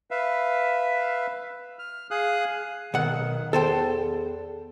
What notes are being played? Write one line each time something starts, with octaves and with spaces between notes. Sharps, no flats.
B4 E5 F5
F6
G#4 F5 D#6 F#6
B1 D#3 F#5
E2 A4 C5 G5